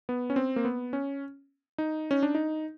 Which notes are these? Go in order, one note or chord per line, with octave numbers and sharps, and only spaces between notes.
B3
C#4
C4
A#3
B3
C#4
D#4
C#4
D4
D#4